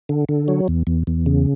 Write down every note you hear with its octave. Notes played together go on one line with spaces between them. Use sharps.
D3
D3
F#3
E2
E2
E2
C#3